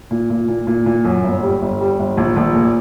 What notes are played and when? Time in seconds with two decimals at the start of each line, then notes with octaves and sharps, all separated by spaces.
0.11 A#2
0.30 A#2
0.48 A#2
0.67 A#2
0.86 A#2
1.05 F#2
1.23 G1
1.43 G3
1.62 G1
1.81 G3
1.99 G1
2.17 A#1
2.37 A#1
2.55 A#2